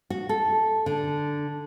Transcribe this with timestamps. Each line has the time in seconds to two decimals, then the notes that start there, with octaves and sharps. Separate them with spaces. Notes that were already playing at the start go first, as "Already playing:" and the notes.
0.10 F#4
0.29 A4
0.86 D3